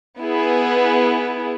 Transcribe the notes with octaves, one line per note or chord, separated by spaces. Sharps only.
B3 E4 G#4